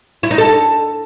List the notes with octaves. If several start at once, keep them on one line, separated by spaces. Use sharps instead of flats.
E4
D#4
A4